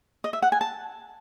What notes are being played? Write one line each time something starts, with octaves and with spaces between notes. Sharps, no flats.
D#5
E5
F#5
G#5
A5